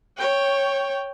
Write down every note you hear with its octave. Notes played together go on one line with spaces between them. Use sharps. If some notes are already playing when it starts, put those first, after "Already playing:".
C#5 G5